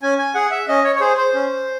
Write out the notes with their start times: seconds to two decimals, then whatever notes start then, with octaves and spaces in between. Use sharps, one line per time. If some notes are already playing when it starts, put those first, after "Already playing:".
0.02 C#4 G#5
0.18 G#5
0.35 G#4 F#5
0.51 E5
0.68 C#4 D#5
0.84 C#5
0.95 C#5
1.00 G#4 C5
1.17 C5
1.34 C#4